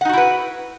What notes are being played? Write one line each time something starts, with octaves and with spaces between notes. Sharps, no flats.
D#4 E4 F#4 B4 F#5